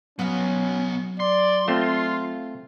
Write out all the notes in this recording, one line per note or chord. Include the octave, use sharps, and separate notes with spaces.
B1 F#3 B3 C#4 F5
D5 C6
A3 C4 F4